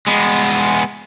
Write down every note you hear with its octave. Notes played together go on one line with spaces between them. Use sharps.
G#3 B3